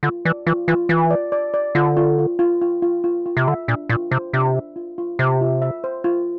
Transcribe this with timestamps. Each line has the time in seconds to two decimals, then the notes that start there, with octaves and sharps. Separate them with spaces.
0.03 D3 F4
0.25 E3 D5
0.46 E3 F4
0.68 E3 F4
0.89 E3 F4
1.11 D5
1.32 D5
1.54 D5
1.75 D3 F4
1.97 F4
2.19 F4
2.39 F4
2.61 F4
2.82 F4
3.04 F4
3.26 F4
3.37 C3
3.47 D3 E5
3.68 A#2 D4
3.89 A#2 F4
4.11 C3 C5
4.33 C3 D4
4.55 E5
4.76 F4
4.98 F4
5.19 C3 C5
5.41 F4
5.62 E5
5.84 C5
6.04 F4